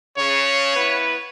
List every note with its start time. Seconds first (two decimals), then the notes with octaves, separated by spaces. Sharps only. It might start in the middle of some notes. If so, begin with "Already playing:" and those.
0.17 C#3 C#5
0.76 B3 E4 B4